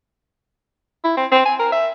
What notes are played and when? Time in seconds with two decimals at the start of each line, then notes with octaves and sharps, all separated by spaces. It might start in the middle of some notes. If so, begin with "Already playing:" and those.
1.04 E4
1.17 C4
1.32 C4
1.46 G#5
1.60 A#4
1.72 E5